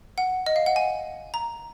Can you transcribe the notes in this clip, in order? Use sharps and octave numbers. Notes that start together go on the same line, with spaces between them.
F#5
D#5
F5
F#5
G#5
A#5